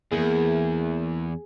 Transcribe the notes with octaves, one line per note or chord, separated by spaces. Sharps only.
E2 E3 A#3 E4 G#4